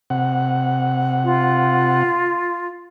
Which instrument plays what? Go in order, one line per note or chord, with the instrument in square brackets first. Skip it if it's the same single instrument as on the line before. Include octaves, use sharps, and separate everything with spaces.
[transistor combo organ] C3 F#5
[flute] F4